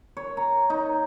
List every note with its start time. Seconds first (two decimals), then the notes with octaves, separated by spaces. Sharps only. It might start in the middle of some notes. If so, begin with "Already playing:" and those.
0.17 C#5
0.37 A#5
0.70 D#4